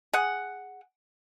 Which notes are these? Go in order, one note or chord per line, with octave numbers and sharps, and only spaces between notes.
G#4 F#5